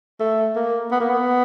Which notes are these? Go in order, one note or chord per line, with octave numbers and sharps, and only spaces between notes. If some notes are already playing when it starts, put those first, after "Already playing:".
A3
A#3
B3
A#3
B3